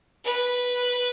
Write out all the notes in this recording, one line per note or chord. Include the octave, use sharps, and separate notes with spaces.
B4